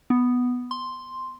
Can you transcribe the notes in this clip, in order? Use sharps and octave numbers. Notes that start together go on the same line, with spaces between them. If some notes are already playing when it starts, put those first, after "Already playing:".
B3
C6